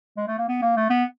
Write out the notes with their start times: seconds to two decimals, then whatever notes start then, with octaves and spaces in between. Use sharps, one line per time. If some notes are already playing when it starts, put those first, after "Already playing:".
0.17 G#3
0.28 A3
0.38 A#3
0.49 B3
0.62 A#3
0.76 A3
0.90 B3